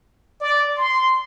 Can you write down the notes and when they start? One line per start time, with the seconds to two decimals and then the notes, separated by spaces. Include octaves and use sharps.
0.41 D5
0.77 C6